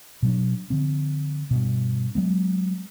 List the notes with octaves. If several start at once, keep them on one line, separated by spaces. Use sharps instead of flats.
B2 F#3 D4
D3 F3 C4
G2 B2
F#3 G#3 B3